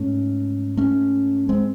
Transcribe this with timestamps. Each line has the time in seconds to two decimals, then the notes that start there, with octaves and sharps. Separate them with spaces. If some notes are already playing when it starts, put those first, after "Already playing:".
Already playing: G#2 A3 C#4
0.77 A3 C#4
1.49 G#3 C4